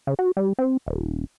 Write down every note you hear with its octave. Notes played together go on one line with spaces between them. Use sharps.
C#3
F#4
G3
C4
D#1